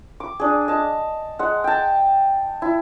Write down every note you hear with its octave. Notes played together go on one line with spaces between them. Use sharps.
D6
D4 G#4
D#5 A5
G#3 F#5
G5 A5
E4